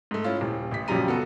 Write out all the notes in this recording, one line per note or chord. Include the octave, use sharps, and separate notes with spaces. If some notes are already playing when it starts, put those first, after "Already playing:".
G#2 A3
C#4 E4 F4
D#1
A1 B6
A#1 F#2 C#3 G3 A#5 D#7
B3 F#4 A4